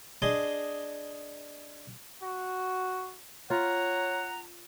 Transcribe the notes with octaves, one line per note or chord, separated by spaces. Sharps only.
D4 G#4 D#5 C6
F#4
F4 C#5 F#5 A#5